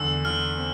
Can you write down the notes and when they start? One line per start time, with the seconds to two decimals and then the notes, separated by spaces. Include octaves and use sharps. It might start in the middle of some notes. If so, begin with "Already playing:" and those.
Already playing: E2 D3 E6
0.25 D3 F6
0.57 C4